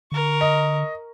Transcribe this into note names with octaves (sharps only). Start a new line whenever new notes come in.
D3 A#4 C#6
D#5